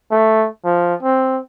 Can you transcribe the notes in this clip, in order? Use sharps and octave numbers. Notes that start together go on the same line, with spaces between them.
A3
F3
C4